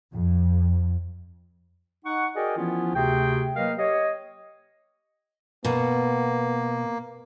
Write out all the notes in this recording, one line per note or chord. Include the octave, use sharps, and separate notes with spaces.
F2
D#4 F#5 C#6
F#4 G#4 A#4 D5 D#5 G5
E3 F3 B3 C#4 E4 F4
D2 C3 F#4 G#4 G5
F#3 A#3 A#4 B4 D#5 F5
G4 C#5 D#5
B2 A#3 B3